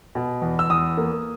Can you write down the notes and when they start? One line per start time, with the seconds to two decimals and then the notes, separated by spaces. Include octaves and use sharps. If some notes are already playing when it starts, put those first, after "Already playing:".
0.15 B2
0.42 E2
0.59 E6
0.70 E2 D#6
0.97 A#3